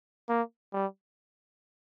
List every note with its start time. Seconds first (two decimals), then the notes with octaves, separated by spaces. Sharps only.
0.29 A#3
0.73 G3